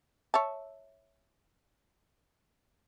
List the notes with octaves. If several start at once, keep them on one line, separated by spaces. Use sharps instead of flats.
C#5 E5 A5